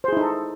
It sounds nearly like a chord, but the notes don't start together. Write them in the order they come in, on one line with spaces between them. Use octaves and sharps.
C5 G#4 E4 D#4 A4